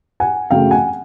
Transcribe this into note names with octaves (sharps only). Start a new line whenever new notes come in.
F#5 G#5
F#2 C#3 F#3 A3 F5 G5
F#5 G#5